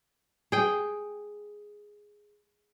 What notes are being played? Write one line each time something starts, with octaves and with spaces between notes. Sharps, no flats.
G#4 G5